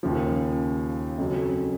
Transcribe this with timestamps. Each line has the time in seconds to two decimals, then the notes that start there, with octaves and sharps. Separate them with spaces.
0.03 D#2 C#3 F3
1.18 F2 C#3 F#3